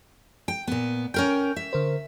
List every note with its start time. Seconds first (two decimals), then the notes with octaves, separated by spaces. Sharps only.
0.48 G5
0.67 A#2 B3
1.14 C#4 A#4 G5 G6
1.56 E5
1.73 D3 A#4 C5